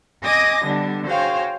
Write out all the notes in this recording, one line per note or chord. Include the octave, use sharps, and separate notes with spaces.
D#5 G#5 D6 D#6 A#6
D3 G3 B3 D4
F#4 G#4 C5 C#5 F5 G5